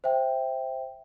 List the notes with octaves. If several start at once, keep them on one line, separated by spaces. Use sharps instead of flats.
C5 E5 G5